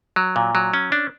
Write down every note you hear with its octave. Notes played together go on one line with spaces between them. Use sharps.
F#3
A#2
F#3
C#4
D4